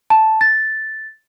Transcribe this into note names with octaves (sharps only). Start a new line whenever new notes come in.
A5
A6